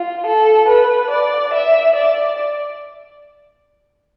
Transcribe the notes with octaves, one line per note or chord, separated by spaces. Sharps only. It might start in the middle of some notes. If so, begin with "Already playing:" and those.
Already playing: F4
A4
B4
D5
E5
D5